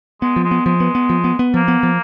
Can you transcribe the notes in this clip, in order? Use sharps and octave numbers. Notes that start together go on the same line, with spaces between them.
G#3 B3
F3
G#3
B3
F3 G#3
B3
B3
F3
B3
B3
F3 A#3
B3
F3